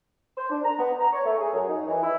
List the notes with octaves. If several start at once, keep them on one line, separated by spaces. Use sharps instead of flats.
C5
D4
A#5
B3
A#5
C#5
A3
G#4
F#2
D#4
E3
E4